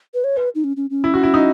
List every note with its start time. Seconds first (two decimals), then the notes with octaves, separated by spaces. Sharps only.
0.14 B4
0.24 C#5
0.37 B4
0.55 D#4
0.64 C#4
0.77 C#4
0.90 C#4
1.04 E4
1.14 F#4
1.23 E4
1.34 D#4